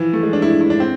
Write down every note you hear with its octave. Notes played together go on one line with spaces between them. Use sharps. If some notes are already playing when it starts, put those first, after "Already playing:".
Already playing: E3 F3
A3
G#3
D4
E4
E4
D4
C4